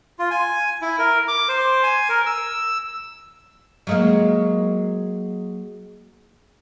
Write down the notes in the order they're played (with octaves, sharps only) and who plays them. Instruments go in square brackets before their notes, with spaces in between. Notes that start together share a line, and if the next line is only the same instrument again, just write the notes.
[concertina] F4
G#5
E4
A#4
D6
C5
G#5
A#4
E6
[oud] F#3 G#3 A#3